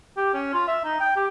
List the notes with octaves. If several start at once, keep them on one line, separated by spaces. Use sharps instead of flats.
G4
C#4
F4
E5
D#4
G5
G4